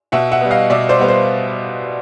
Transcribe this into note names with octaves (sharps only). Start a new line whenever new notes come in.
B2 E5 F#5
E5 F#5
G3 B3
D#5 F5
B2 D5 E5
C5 D5
G3 B3
C5